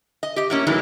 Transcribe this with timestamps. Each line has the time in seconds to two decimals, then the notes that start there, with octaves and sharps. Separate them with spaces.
0.23 D#5
0.36 G4 D#5
0.50 A2 A#3 C#4
0.67 A2 E3 F#3 G#3 A#3 D#4